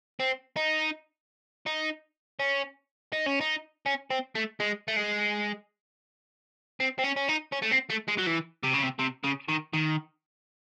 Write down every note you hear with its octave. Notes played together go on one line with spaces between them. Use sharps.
C4
D#4
D#4
C#4
D#4
C#4
D#4
C#4
C4
A3
G#3
A3
G#3
C4
C4
C#4
C#4
D#4
C#4
A3
C4
A3
G#3
F#3
E3
C3
C#3
C3
C3
C#3
D#3
D#3